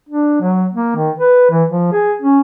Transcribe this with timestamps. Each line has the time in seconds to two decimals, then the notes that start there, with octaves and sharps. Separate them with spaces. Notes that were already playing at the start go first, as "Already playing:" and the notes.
0.09 D4
0.41 F#3
0.74 A#3
0.96 D#3
1.19 B4
1.51 E3
1.70 F3
1.92 G#4
2.22 C#4